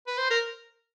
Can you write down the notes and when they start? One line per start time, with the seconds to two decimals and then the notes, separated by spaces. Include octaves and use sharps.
0.07 B4
0.17 C5
0.30 A#4